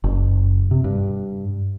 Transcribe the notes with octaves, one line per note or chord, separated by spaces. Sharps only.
F#1
C3
G2